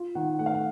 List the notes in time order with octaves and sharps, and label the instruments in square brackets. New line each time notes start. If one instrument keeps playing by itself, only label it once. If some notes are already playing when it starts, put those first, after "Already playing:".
Already playing: [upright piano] F4
[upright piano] D#3 [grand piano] F#5
[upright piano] A3 [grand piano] F#5
[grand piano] F5
F#5